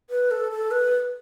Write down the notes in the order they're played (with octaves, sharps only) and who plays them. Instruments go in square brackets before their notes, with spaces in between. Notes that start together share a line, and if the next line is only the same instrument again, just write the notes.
[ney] B4
A4
A4
B4